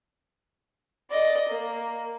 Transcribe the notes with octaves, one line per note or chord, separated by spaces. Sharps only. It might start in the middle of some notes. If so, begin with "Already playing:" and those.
D5 D#5
A#3